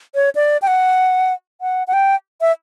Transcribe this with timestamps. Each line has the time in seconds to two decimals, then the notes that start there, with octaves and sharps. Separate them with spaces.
0.15 C#5
0.35 D5
0.62 G5
0.67 F#5
1.61 F#5
1.87 F#5
1.93 G5
2.41 E5